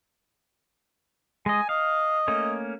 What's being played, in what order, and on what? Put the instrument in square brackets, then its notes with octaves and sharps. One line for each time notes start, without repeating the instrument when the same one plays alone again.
[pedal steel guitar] G#3 D#5 [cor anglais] G#5
[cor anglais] D#5 [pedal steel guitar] F5
[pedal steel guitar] A3 A#3 C#4